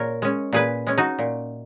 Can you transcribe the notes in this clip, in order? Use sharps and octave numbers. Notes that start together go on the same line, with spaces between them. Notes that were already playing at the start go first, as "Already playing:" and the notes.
Already playing: A#2 A#4 C#5
G#3 C#4
A#2 G#4 B4
G#3 C#4
D#4 F#4
A#2